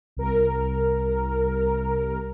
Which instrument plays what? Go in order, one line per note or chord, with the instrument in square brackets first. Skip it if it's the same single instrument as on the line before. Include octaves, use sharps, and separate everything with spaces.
[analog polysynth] C2 A#4